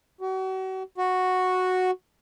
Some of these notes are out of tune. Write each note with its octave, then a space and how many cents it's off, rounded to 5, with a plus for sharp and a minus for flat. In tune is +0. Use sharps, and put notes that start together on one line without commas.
F#4 +35
F#4 -5